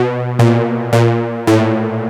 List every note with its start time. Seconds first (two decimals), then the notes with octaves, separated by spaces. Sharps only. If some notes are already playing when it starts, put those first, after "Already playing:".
Already playing: B2
0.39 A#2
0.93 A#2
1.47 A2